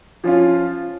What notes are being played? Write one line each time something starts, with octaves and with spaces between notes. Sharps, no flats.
F3 C#4 F4